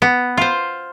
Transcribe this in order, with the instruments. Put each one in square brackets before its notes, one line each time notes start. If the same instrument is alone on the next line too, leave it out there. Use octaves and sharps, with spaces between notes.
[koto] B3
F4 C5